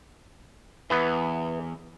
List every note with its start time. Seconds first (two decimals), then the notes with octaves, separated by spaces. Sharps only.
0.90 E2 E3 B3